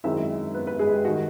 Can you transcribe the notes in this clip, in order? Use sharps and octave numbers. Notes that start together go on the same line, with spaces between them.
F#2 D#3 G#3 C4 E4 E5
B3 B4
B3 B4
G#3 G#4
G4
D#3 G3 F#4